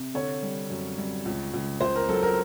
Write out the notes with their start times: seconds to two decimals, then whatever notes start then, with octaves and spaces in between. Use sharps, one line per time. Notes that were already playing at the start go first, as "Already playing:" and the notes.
Already playing: C3
0.14 D3 C#5
0.42 G3
0.70 F#2
0.98 G3
1.25 C#2
1.54 C#2
1.81 C#2 C5
1.96 A#4
2.09 F#3 A4
2.23 A#4